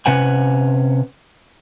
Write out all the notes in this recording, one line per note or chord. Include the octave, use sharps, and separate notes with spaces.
C3 C#4 B4 F#5 G#5